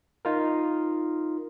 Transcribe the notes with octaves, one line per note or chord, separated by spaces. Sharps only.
D#4 F4 A#4